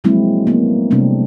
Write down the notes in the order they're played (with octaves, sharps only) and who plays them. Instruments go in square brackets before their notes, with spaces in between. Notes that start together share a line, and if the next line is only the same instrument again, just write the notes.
[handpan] F3 F#3 G#3 A#3 C4 E4
A#3 B3
C3 G3 A3 C4 D4